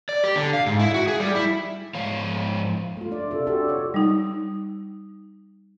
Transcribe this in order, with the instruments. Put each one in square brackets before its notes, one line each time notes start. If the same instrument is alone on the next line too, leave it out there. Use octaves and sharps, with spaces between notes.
[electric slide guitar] D5
G4
D3
F5
G#2
E4
F#4
G#4
G3
E4
G#2 F3 C#5 F5
[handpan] A3 F4
D4 D5
C3 F4 A4
D4 F#4 G4 A4
F4 C#5 D5
[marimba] G3 D#4